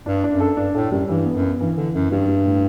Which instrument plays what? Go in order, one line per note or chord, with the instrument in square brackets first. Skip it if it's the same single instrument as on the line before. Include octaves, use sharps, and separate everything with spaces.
[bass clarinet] G2 [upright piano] D4
[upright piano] D4
[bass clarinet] F#2
[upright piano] A4
[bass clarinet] G2 [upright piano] D4
[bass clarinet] A2 [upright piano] A4
[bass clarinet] F#2 [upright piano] G3
[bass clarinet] G2 [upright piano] E3
[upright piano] B3
[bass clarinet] F#2
[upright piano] B3
[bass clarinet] G2 [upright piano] E3
[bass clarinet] D3 [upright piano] E3
[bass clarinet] F#2 [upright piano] E3
[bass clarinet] G2 [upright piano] G3
[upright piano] G3
A2